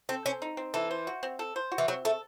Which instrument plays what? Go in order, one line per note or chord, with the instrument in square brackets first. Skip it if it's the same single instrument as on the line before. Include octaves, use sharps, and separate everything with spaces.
[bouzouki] C4 [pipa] A4
[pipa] C4 [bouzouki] C#4
[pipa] D#4
C4
[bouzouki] E3 [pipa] A4
[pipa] C5
F#4
C4
A4
C5
F#4
[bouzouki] E3
[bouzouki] F#3 [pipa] C4
[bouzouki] A3 [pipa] A4